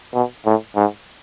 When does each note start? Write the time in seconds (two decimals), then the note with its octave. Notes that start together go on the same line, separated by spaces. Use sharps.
0.14 B2
0.45 A2
0.76 G#2